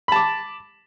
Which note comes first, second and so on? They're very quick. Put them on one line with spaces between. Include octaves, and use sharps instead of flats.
B5 A5 D6